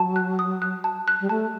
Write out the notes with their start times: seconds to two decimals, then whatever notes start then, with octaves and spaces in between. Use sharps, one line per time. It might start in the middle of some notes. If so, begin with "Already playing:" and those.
Already playing: F#3 A5
0.16 F#6
0.39 D#6
0.62 F#6
0.84 A5
1.08 F#6
1.21 G3
1.29 A3 A5